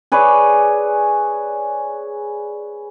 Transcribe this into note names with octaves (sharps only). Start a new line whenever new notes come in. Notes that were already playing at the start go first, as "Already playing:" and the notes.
G#4 B4 C#5 D5